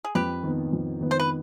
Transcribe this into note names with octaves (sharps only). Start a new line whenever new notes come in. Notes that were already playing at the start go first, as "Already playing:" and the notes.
G#4
F2 G4 B4
D#3 B3
F2
D#3 B3
C5
B4